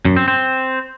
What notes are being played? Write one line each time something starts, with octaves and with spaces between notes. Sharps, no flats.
F#2
C4
C4